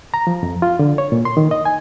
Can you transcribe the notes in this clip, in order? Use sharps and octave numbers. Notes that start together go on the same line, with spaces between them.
A#5
F3
F2
F4
D3
C#5
A#2
C6
D#3
D#5
G#5